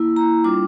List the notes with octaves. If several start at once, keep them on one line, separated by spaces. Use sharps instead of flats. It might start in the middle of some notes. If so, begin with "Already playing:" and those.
Already playing: A#3 E4
A#5
G3 D4 F4 D6